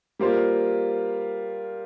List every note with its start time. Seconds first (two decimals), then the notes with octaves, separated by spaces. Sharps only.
0.19 G3 A#3 F4 C5